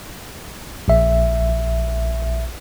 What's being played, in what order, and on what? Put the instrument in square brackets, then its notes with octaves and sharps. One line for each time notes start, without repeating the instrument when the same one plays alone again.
[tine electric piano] A#1 E5